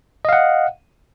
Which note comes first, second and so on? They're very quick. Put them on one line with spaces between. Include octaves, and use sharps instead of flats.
D#5 F5 F#5